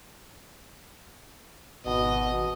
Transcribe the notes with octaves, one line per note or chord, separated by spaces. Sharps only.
G#1 B2 D#5